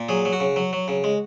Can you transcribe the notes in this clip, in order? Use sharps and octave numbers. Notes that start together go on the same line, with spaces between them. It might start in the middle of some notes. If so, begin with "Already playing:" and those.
Already playing: A#2
F#3 G#4
F#3
F#4
C#3
F#3
F#3
C#3
G#3